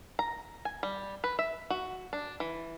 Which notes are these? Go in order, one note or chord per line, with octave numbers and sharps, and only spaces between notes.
A#5
G#5
G3
B4
E5
F#4
D4
E3